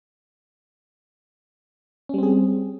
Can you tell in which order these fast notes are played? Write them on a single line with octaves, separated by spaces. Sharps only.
C#4 G3 C4 G#4